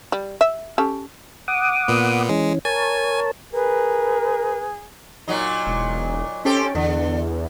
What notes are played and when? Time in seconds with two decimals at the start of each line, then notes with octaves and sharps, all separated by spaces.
0.12 G3
0.41 E5
0.78 C#4 G4 A4
1.48 F#5 D6 D#6
1.88 A#2 B3
2.29 E3 G#3 C#4
2.65 A#4 C#5 G#5 A5
3.53 G#4 A#4 B4
5.28 A#2 F#3 D#4
5.67 E1
6.45 C4 C#4 G4 A4
6.75 E2 D3